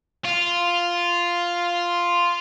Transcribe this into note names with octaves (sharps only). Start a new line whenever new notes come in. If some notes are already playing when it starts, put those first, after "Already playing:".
F4